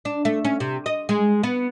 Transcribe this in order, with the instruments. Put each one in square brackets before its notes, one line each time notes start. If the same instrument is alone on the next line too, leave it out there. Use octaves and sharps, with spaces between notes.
[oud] D4
A3
C#4
C3
D#5
G#3
B3